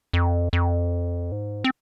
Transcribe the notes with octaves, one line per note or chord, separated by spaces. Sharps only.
F2
F2
G#2
C4